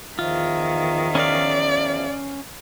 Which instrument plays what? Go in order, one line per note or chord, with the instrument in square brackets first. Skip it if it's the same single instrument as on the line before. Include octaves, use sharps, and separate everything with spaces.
[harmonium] E2 F3 E5 [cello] D#3 [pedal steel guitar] F4
[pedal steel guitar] C#4 F5 [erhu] D5